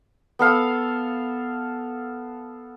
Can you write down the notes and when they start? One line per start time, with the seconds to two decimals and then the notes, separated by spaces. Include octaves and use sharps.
0.39 B3 A4 F5